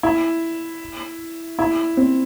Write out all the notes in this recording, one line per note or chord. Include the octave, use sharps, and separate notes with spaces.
E4
E4
C4